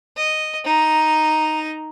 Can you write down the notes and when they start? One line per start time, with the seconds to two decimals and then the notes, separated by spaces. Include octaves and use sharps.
0.17 D#5
0.65 D#4 A#5